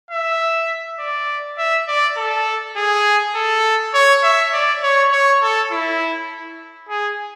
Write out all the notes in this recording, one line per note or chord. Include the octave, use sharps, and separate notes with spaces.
E5
D5
E5
D5
A4
G#4
A4
C#5
E5
D5
C#5
C#5
A4
E4
G#4